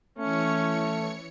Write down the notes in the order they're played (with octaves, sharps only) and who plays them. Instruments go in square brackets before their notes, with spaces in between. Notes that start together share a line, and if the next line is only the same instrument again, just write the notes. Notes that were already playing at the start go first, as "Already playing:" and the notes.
[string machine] E3 C#5 C#7 [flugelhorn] A3 [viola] C#4